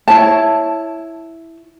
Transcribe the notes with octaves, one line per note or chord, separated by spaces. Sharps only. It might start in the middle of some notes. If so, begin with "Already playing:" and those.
E4 C#5 A5